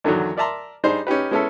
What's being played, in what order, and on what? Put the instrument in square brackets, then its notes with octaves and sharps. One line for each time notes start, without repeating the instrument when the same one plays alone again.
[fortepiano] E2 D3 D#3 F#3
A#4 D5 E5 A5 A#5 C6
G3 D4 D#4 G#4 C5
C#4 D#4 G4 B4
G#3 B3 C#4 E4 A4 E5